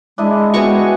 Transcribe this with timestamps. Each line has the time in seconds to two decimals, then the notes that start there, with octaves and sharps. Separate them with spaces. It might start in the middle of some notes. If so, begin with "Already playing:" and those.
0.18 G#3 D4 E4 D#5
0.54 B3 F#4 G5 G#5 C#6